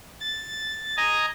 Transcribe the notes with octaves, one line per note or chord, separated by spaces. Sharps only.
A6
D#5 G#5 A#5